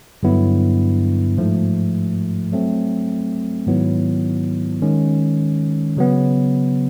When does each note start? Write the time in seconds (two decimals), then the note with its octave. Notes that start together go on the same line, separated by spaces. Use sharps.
0.23 G2 D3 F#3 B3 E4
1.38 G#2 F3 A3
2.52 F#3 A3 C4
3.67 G#2 D#3 F#3 B3 E4
4.82 D#3 G#3 C#4
5.97 C#3 F#3 B3